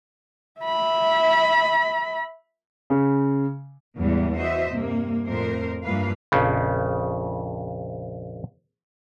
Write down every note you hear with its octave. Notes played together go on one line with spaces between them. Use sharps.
E5 B5
C#3
E2 A2 C#3 E3 G3 G#3
E3 F#4 C5 D#5 E5
G2 C3 A#3
F2 A2 A#4 C5
G2 E3 F3 A#3 B4 F5
A#1 F2 C#3